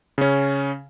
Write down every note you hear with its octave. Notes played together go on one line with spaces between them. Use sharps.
C#3 C#4